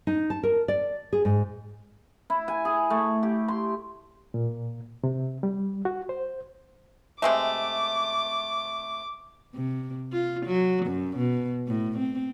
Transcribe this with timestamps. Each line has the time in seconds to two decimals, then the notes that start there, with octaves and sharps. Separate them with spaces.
0.07 D#4
0.30 A5
0.43 A#4
0.68 D5
1.13 G#4
1.25 G#2
2.30 E4
2.48 G#5
2.65 G#4
2.90 A3
3.23 G4
3.48 C6
4.34 A#2
5.04 C3
5.43 G3
5.85 F#4
6.09 C5
7.22 C3 G#3 A3 D6
9.55 C3
10.13 F4
10.47 F#3
10.86 F#2
11.18 B2
11.67 A2
11.99 C4